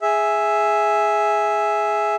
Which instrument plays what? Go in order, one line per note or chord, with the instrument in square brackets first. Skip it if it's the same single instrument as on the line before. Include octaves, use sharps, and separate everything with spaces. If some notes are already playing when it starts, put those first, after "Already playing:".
[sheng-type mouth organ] G#4 E5